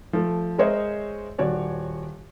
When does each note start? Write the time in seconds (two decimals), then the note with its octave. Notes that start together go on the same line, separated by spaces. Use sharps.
0.13 F3 A3
0.58 G#3 A#4 C5 C#5 D#5 E5
1.38 D#1 F#4 C#5 D5